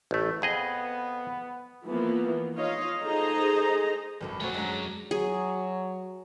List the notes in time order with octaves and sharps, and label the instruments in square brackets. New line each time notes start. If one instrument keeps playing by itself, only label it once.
[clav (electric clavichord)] A1 A3
[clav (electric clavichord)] F2 G#4 D#5 [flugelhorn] B3
[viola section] E3 F3 A#3 B3
D#4 F4 C#5 D#5 F5
D#4 G#4 A4 C5 D#5 A#5
[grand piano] G#1 F#2 [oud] B2 D3 E4
[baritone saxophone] F#3 [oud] A3 A#3 C4 [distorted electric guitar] F4 C#5 [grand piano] G#5
[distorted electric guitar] F#2 [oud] G#3 [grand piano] D4 C#5 A#5
[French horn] F#3 [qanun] G#4